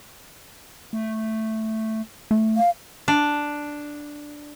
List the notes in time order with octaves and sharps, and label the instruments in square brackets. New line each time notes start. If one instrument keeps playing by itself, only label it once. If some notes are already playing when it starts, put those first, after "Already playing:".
[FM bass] A3
[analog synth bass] A3
[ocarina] F5
[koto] D4